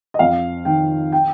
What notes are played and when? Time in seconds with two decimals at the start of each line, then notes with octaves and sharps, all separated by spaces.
0.14 D#5
0.19 F2 F5
0.65 D#3 G5
1.12 G5